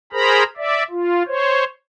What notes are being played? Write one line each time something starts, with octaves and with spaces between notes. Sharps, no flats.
G#4 A#4 C5 A#5 B5
D5 E5
F4
C5 C#5